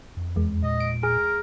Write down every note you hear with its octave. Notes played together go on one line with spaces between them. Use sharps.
F2
E2 G#3
A#2 D#5
D7
G#4 A#4